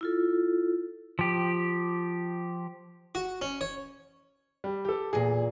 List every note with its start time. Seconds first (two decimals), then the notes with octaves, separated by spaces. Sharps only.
0.01 E4 F4 A4
1.19 F3 G4
3.15 F#4
3.42 C#4
3.61 C#5
4.64 G3
4.85 G4 A4
5.13 E2 A#2 G#4